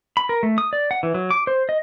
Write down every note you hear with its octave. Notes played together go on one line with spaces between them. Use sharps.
B5
A#4
A3
D#6
D5
F#5
E3
F#3
D6
C5
D#5